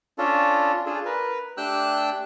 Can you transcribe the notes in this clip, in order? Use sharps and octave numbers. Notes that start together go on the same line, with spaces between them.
C#4 D4 F4 A4
D4 F4 G#4 A4
A#4 B4
A3 D4 G4 G5 E6 F#6